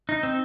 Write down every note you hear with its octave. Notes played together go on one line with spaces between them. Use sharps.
D#4
C4